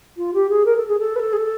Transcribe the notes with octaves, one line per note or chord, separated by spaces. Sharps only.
F4
G4
G#4
A#4
A4
G#4
A4
B4
A4
G#4
A4